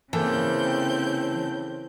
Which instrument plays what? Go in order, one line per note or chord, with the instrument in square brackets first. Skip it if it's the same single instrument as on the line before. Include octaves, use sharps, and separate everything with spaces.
[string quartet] C#3 C4 G6 [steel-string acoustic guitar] E3 [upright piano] A#3 A4